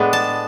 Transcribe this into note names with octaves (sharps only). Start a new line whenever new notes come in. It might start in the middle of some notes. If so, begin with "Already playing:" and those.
Already playing: A2 G#3 B3 D4
A5